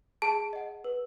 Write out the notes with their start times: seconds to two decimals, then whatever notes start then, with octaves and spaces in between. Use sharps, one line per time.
0.22 G#4 A5
0.53 D#5 F#5
0.84 B4